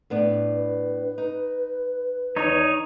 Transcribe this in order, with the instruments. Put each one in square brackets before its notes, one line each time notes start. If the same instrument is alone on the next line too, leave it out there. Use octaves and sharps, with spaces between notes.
[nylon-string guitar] A2 B3 D4
[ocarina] B4
[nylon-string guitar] D#4
[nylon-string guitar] E2 D#3 [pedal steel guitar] D#4 C#5